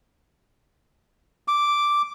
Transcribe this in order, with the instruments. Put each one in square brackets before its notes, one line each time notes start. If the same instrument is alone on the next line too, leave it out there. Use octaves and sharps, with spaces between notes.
[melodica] D6